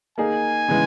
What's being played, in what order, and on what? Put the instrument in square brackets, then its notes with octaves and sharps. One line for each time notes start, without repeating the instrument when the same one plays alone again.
[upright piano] A#3 D#4 G#4 [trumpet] G#5
[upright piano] C#3 E3 G#3 B3